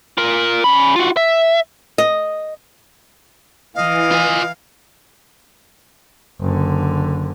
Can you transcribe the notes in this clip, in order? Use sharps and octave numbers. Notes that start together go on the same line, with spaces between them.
F4 A#4
C#4 B5
F4 F#4
E5
D#5
E3 D#5 F5
F4 G#5
F#1 D3